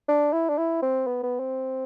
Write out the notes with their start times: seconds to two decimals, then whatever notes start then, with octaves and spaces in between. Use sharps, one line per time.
0.08 D4
0.33 E4
0.49 D4
0.58 E4
0.82 C4
1.07 B3
1.23 B3
1.40 C4